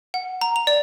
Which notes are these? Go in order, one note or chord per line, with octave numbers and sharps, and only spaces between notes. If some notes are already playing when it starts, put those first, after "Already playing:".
F#5
A#5
F7
D5